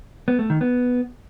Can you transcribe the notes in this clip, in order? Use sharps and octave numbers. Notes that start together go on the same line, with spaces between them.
B3
A3
D#3
B3